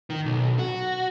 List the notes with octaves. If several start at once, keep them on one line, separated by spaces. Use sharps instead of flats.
D#3
B1
F#4